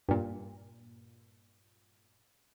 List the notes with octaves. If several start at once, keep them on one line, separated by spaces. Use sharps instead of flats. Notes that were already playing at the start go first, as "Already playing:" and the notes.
G2 A#2